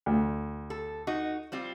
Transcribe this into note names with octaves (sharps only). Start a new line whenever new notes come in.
D2
A4
D#4 F#4
G3 C4 F4